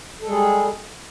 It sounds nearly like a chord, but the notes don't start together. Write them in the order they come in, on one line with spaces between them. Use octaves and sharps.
A4 G#3 G3 G#4